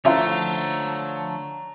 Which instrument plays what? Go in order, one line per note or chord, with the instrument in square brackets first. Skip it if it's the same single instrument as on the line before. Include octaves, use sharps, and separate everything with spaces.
[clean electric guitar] D3 F3 A3 [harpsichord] C#4 E4 F4 [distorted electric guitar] C#5 A#5